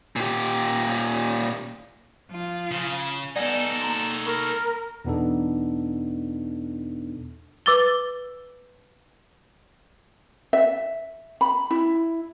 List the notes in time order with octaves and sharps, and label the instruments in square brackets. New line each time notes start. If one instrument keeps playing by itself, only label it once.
[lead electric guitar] A#2 G4
[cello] F3 F4
[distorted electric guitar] C#3
[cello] B3 [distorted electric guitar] D#4 A4 [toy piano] D5 F#5 G#5
[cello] A#3 [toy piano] A#5 C6
[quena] A#4 [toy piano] B5 C#6 D#6
[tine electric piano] E2 B2 B3 D4 D#4 A4
[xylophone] B4 D6 E6 A6 G7
[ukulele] E5
B5
E4